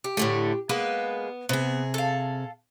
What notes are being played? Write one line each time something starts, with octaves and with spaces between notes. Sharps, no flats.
G4
A2 D3 A3
G#3 A#3 B3 B4
C3 B3 G#4
A4 F5